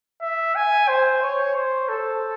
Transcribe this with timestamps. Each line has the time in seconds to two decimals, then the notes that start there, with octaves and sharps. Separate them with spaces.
0.22 E5
0.55 G#5
0.88 C5
1.22 C#5
1.56 C5
1.89 A4